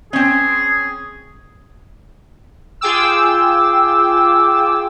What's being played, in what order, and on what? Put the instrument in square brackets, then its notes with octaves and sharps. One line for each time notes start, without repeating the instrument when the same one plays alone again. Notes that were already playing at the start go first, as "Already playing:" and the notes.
[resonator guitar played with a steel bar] C4 C#4 [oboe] G#4
[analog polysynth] F4 G#4 G5 D6 E6